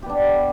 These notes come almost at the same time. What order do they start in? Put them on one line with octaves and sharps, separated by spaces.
G4 B3 D4